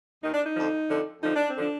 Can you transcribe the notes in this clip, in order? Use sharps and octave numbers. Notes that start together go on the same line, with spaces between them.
D#2 D#3 D#4
D4
D#4
F2 D3 F3
F2 D3 F3
F2 D3 F3 D#4
D4
C4
D3 F3 D4